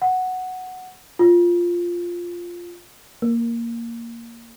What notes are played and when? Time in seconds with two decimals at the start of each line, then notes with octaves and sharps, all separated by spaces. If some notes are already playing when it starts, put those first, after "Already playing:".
0.02 F#5
1.19 F4
3.22 A#3